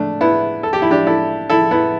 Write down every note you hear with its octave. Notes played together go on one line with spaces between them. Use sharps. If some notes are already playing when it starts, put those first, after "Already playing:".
Already playing: A3 D4
B3 E4
A4
G4
E4
D4 G4
E4 A4
E4 A4
B3 E4